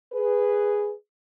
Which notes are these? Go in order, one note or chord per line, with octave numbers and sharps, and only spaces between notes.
G#4 B4